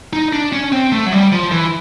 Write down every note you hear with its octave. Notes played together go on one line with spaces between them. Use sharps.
D#4
D4
C#4
C4
A3
F#3
G3
F3
E3